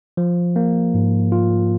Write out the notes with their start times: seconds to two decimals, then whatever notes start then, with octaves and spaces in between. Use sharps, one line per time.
0.17 F3
0.56 A#3
0.94 G#2
1.32 F4